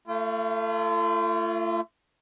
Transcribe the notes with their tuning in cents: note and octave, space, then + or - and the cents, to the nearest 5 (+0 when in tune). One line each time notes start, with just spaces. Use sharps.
A3 +20 F4 -35